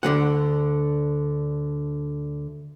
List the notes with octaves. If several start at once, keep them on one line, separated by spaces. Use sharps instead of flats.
D2 D3 E3 F#5